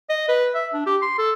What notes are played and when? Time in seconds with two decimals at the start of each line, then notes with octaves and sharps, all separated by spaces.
0.09 D#5
0.29 B4
0.55 E5
0.74 D4
0.86 G4
1.02 C6
1.18 A4